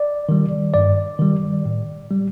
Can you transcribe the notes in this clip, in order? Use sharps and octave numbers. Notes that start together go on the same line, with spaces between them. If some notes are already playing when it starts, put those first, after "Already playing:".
Already playing: D5
D#3 G3
G2 D5
D#3 G3
A2
G3